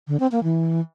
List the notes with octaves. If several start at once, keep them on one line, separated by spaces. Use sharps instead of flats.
D3
C4
A#3
E3